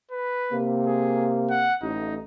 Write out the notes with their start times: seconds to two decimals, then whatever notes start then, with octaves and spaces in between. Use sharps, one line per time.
0.11 B4
0.52 C3 A#3
0.87 G#4
1.50 F#5
1.82 A1 D#4